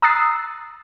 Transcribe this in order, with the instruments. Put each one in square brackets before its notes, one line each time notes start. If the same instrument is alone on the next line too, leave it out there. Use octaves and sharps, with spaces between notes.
[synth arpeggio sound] A#5 D#6 E6 F#6 A6 C7